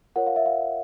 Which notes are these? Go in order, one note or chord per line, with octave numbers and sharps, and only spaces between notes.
F4 A#4 C#5 F#5
F5
E5
F5